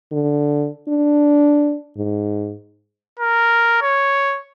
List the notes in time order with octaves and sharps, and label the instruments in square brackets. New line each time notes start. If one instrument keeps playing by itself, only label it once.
[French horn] D3
D4
G#2
[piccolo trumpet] A#4
C#5